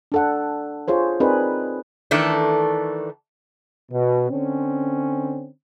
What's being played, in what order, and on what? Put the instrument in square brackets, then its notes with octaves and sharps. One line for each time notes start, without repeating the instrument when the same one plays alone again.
[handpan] D4 A4 F#5
F4 G#4 C5 C#5
C4 D#4 G#4 A#4 B4 D5
[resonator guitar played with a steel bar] D#3 E3 A3 D4 A4
[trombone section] B2
D3 C4 C#4